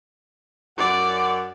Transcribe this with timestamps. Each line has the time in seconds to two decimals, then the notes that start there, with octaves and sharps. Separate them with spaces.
0.78 F#2 D5 F#5